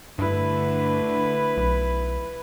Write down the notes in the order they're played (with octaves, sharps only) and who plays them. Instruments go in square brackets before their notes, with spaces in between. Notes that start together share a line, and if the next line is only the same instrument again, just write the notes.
[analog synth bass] G2 [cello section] D3 A3 [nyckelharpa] E4 B4
[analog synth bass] B1